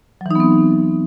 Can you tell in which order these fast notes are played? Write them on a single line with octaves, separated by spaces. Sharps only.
F#3 E3 D#4 B3 C4